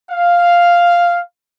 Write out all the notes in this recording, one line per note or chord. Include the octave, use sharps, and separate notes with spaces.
F5